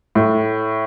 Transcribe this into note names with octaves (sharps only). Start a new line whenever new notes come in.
A2